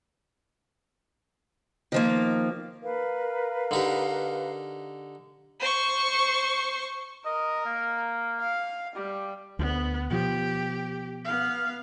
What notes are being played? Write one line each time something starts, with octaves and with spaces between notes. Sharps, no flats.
D#3 F3 A#3
A#4 B4 F5
D3 D#4 G4
C5 C#6
A#4 D#5
A#3
F5
G3 G4
D2 B3
B2 F3 G4
B3 F5